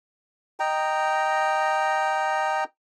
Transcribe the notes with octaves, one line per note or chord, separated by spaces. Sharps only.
D#5 G5 A#5